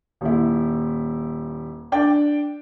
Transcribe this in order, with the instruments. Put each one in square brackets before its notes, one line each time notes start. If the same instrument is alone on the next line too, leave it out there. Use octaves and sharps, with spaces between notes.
[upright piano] D#1 E4
D4 D5 G5